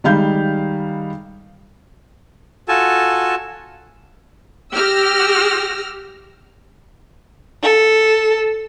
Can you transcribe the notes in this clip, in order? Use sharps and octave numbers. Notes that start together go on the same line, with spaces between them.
D#3 G3 G#3 F5 B5 G6
F4 F#4 A4 G#5 A5
G4 E6 F6 A#6
A4